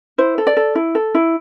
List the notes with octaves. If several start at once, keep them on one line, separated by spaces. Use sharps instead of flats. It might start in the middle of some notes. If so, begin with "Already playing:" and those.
E4 C5
A4
D5
A4
E4
A4
E4